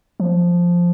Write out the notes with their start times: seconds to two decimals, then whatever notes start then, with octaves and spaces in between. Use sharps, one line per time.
0.20 F3